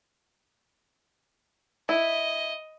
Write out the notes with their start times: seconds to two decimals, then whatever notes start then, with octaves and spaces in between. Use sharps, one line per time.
1.89 E4 D#5